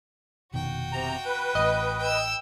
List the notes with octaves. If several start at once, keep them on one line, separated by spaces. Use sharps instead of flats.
F1 B2 D#3 F#4 G5
C3 A#5
B4
A1 A2 D#5
G5 E6